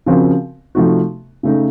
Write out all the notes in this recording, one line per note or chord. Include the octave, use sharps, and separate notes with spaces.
C#3 F3 C4 F#4 A#4
C3 F3 A3 D#4 F#4
C#3 A3 D#4